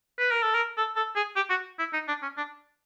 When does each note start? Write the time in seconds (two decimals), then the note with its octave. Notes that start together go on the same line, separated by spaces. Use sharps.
0.19 B4
0.32 A#4
0.43 A4
0.55 A#4
0.78 A4
0.96 A4
1.16 G#4
1.36 G4
1.50 F#4
1.79 E4
1.93 D#4
2.08 D4
2.22 C#4
2.37 D4